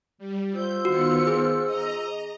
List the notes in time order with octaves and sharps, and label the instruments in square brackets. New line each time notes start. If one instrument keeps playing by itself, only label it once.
[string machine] G3
[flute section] F4 C5 E6 [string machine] G6
[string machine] D#3 B3 C#7 [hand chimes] F#4
[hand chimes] G#4
[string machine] D#5 A#5